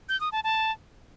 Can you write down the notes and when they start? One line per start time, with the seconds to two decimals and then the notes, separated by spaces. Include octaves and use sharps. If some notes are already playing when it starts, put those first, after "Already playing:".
0.09 G6
0.21 D#6
0.32 A5
0.44 A5